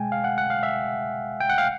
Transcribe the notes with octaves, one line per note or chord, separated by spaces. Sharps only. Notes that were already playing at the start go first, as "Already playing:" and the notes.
Already playing: B2 G#3 G5 G#5
F5
F#5
F#5
F5
E5
G5
F#5
F5